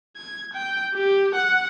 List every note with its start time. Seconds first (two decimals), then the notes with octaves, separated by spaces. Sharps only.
0.17 G#6
0.53 G5
0.94 G4
1.35 F#5